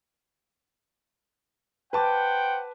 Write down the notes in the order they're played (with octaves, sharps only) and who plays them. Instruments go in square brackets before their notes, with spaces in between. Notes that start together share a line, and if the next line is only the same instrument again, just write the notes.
[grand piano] B4 A5 D6 [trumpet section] C5 F#5 G5